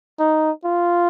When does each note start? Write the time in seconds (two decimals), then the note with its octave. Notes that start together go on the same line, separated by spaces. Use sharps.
0.19 D#4
0.64 F4